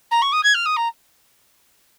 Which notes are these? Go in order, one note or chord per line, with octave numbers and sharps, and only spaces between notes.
A#5
C#6
D#6
G#6
F6
D#6
A#5